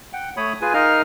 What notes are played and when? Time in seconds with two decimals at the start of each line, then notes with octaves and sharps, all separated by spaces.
0.13 F#5 G5
0.37 A3 C#5 B5 D#6
0.61 F4 G#4 B4 G#5
0.74 D#4 A#4 D#5 F5 F6